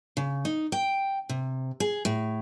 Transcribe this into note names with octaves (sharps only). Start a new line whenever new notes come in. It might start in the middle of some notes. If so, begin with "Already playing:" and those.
C#3
D#4
G5
C3
G#4
A2